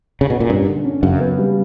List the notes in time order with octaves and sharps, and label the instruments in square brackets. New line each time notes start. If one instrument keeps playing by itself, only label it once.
[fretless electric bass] C#3
B2
A#2
[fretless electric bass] G2 [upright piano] C#4
[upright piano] D3
C#4
[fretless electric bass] F#2 [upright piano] C#3
[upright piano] B3
G3